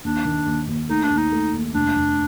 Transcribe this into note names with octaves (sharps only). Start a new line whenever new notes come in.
D#2 D4
D#3
D#2
D#2
A3 D#4
D4
D#2
D#4
A3
D#2
F1 D4
F1